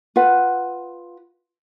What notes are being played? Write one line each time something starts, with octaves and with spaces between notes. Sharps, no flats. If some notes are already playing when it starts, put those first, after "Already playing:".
F4 B4 F#5